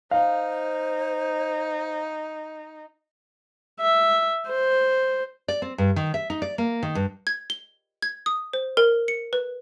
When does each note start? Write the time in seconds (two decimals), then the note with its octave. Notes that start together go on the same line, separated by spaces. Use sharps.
0.11 D#4 C5 F5
3.80 E5
4.49 C5
5.48 D5
5.62 C4
5.78 G2
5.96 D#3
6.14 E5
6.30 D#4
6.42 D5
6.58 A#3
6.83 D#3
6.95 G2
7.27 G#6
7.50 G7
8.02 G#6
8.26 D#6
8.53 C5
8.77 A#4
9.08 C#7
9.33 B4